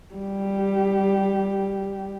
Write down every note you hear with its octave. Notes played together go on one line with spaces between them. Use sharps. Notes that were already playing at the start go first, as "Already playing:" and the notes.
G3 G4